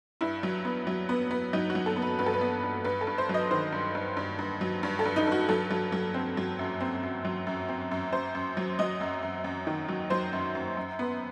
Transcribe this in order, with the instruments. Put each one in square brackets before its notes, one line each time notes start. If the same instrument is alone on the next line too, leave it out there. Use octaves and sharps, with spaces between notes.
[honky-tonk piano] G2 E4
F#3
B3
F#3
B3
B3
F#3 D#4
F#4
F#3
A4
B3
B4
G2 B4
A4
B4
B3
G2
G2 B4
A4
G2
C5
F#3 D#5
D#3 C5
G2
G2
G2
G2
F#3
G2
A4
G2
D#4
G2 F#4
F#3 A4
F#3
F#3
C4
F#3
F#2
C4
F#2
F#3
F#2
C4
F#2
F#2 C5
F#2
F#3
F#3 D#5
F#2
F#2
F#2
D#3
F#3
F#3 C5
F#2
F#2
F#2
B3